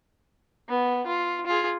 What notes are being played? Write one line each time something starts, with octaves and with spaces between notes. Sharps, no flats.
B3
F4
F4 G#4